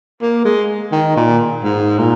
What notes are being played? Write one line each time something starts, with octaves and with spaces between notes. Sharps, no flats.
A#3
G#3
D#3
A#2
G#2
A#2